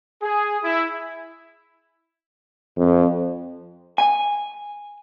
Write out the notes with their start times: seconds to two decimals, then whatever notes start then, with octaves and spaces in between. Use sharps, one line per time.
0.22 G#4
0.63 E4
2.78 F2
3.98 G#5